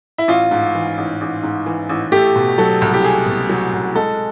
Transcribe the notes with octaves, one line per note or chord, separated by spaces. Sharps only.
E4
A1 F4
G#2
E3
A1
A1
G#2
E3
A1
A3 G4
B2
F#3 A4
C2
G4
A3 G#4
B2
F#3
C2
G#3 A4